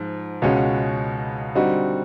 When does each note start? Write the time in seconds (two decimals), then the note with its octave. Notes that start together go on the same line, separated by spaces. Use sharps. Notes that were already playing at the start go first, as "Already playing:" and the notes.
Already playing: G#2 F3
0.42 C#2 B2 G#3 C#4 F#4
1.55 D3 G3 C4 D#4 F#4